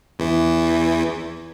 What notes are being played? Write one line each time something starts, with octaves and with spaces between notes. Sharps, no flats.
E2 E3